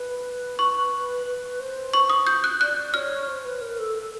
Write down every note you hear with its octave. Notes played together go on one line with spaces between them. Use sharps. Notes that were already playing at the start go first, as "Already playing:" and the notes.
Already playing: B4
C#6
B4
C5
C#6
D#6
G6
F#6
D5 F#6
C#5 F6
C5
B4
A#4
A4